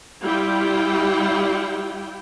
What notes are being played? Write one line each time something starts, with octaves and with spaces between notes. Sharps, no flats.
G3 E4 F4 G5